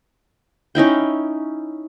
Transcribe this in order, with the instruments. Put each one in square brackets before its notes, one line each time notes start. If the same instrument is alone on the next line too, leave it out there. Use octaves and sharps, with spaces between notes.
[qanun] C#4 D#4 E4 G5